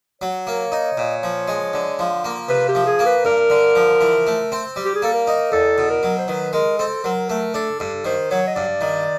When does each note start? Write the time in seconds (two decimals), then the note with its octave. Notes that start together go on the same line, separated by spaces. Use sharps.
0.22 F#3 C#5
0.47 A#3
0.72 D#4
0.97 A#2
1.23 F3
1.48 G#3
1.73 D3
1.99 F3
2.25 A#3
2.49 C3 B4
2.69 G4
2.75 F3
2.87 G#4
2.99 A#3
3.06 B4
3.25 G2 A#4
3.50 D3
3.75 F3
4.01 E3
4.27 A3
4.52 C4
4.76 G3
4.85 G4
4.95 G#4
5.02 A#3 A4
5.14 A#4
5.27 D#4
5.52 E2 A4
5.78 B2
5.91 A#4
6.03 F#3
6.18 C5
6.28 D#3 B4
6.53 G#3 A#4
6.78 C4 A4
7.04 F#3 A#4
7.29 A3 A#4
7.54 D4 A4
7.79 G2 A4
8.05 D#3 C5
8.31 F#3 C#5
8.47 D#5
8.55 G2 D5
8.81 D#3